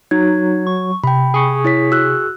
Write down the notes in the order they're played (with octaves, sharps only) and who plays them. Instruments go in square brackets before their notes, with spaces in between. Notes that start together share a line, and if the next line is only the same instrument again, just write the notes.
[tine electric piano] F#3 [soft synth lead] D#4 [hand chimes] G#6
[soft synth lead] C#6
[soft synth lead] C3 [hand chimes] G5 B5
[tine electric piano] G#4 C#6
[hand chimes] E4 C#5 B6
F#4 E6 F#6